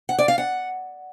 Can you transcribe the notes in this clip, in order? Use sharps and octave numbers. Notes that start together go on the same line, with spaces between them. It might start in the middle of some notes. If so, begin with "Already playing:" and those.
F#5
D5
F5
F#5